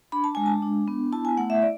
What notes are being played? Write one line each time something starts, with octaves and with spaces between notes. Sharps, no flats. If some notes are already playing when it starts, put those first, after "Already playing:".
D4 B5
A5
G#3 G#5
A5
D4
B3
E4 A5
G#5
A3 F#5
E5
D5